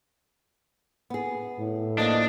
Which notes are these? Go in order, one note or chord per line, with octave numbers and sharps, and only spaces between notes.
B3 G#4
A2
F3 A#3 D4 D#4 D#5